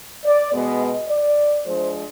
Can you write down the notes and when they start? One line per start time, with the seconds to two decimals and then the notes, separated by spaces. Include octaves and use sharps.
0.24 D5
0.52 B2 G#3 B3
0.80 D#5
1.09 D5
1.65 F3 G#3 D4 C5